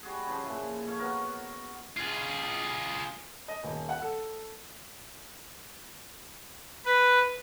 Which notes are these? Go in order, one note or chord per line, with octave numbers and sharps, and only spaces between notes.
G3 F#4 G#4
C#3 F3 C5
A#2 F3 E4
A4 C#5 F5
B3 F#4 A#4
F4 G#4
D#5
D#1
F#5
A4
B4